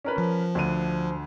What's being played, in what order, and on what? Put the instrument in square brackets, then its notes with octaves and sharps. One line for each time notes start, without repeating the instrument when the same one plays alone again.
[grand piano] C#4 A#4 B4
[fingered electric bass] F3
[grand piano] D2 D3 D#7